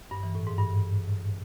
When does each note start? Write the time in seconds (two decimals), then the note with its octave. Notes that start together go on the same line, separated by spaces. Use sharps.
0.11 G2
0.23 E3
0.35 A2
0.47 G#2
0.59 G2